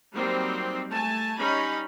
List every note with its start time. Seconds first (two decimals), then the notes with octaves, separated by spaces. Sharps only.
0.14 F#3 G3 A#3 C4 D#4 C5
0.91 A3 G#5 A5
1.39 G3 C#4 D#4 B5